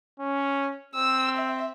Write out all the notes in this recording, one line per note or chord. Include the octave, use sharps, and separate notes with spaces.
C#4
C4 E6
E5